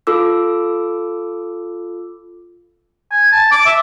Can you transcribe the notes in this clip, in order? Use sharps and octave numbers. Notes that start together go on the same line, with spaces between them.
F4 A4 D6 E6
G#5
A5
D6
E5